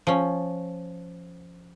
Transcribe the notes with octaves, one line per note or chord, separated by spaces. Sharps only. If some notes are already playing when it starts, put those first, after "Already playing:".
F3 C#4